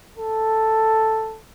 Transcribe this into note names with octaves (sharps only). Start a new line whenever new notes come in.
A4